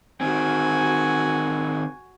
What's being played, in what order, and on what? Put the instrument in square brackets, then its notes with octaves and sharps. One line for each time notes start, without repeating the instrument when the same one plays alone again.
[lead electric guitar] D#3 C4 [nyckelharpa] F#4 G#5